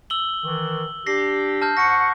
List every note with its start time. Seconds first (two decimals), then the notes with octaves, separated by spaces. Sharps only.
0.10 E6 F#7 G7
0.44 D#3 E3
1.06 D4 G4 A#6 C7
1.62 A5 F6 G6
1.77 G#2 F#5 C#6 A#6 C#7